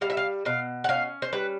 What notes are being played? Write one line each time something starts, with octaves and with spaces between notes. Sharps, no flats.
G3 F5
E5
F5
B2 F5
F#5
C#4 F5
C5
G3 B4